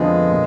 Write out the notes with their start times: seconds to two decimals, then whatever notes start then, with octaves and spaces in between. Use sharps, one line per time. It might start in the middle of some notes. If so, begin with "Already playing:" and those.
Already playing: F2 D3 F3 G#3 B3
0.31 A#2